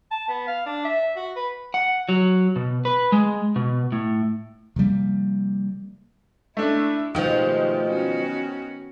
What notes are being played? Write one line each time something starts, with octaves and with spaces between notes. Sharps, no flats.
A5
B3
F5
D4
E5
F#4
B4
F#5
F#3
B2
B4
G#3
B2
A2
C3 F3 G3 A#3
A3 D4 E4
B2 D#3 F3 G#3 A3 G4
B3 C#4 F#4